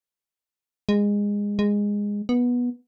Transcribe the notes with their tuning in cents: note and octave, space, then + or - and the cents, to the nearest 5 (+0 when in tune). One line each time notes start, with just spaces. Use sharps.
G#3 -20
G#3 -15
B3 -15